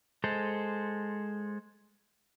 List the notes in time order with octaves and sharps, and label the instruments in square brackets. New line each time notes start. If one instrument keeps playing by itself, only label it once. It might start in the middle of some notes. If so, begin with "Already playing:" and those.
[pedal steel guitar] G#3 A4 C5